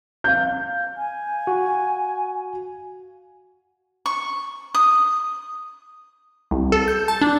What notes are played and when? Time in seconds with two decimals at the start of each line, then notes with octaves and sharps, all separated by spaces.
0.24 F5 G6
0.97 G#5
1.47 F#4
4.06 C#6
4.75 D#6
6.51 C2
6.72 A4
6.88 G6
7.08 A5
7.21 D4